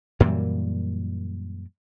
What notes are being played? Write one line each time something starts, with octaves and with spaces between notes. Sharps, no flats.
F#2 A#2 E3 G3